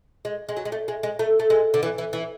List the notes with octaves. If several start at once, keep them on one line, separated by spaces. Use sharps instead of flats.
G#3
G#3
F#3
G#3
A3
G#3
G#3
A3
A3
G#3
D3
E3
E3
E3